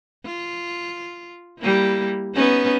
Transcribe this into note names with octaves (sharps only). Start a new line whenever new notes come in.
F4
G3 A#3 E4
B3 C#4 D#4